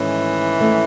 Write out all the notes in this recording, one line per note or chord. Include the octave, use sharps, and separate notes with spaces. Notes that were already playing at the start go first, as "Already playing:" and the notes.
Already playing: G#2 D#3 E3 A3 C#4
G#2 D#3 A3 C#4